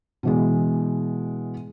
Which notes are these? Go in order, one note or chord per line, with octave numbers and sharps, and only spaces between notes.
B2 E3 G#3